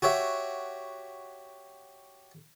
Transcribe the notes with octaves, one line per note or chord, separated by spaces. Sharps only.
F#4 G4 C#5 E5